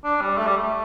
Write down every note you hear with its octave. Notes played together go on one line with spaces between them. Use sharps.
D4
G3
A3
G3
A3